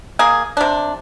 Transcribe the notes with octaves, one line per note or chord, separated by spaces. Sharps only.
A#3 G#4
C3 D4